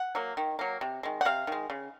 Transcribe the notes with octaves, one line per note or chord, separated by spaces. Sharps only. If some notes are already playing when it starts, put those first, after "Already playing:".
Already playing: F#5
F#3 A#3
D#3
F#3 A#3
C3
D#3 G#3
F#5
C3 F5
D#3 G#3
C#3